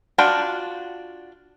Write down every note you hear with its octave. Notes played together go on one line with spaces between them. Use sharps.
D4 F4 F#4 G5